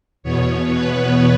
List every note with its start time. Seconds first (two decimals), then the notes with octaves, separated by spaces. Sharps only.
0.23 E2 B2 B3 C#5
0.72 B4